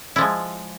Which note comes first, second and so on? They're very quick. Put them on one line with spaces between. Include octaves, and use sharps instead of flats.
E4 F3 G#3